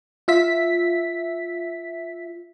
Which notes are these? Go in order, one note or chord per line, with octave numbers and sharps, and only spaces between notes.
F4 E5 B6